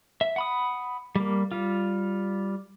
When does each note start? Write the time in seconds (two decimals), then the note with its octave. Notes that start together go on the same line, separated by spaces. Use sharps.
0.21 E5
0.36 F#5 B5 D#6
1.16 G3 A#3
1.52 G3 F4